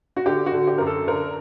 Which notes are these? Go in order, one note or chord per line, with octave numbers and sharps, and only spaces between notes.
F#4
D3 G4
F#4
D3
G4
F#2 A#4
A4
D3 A#4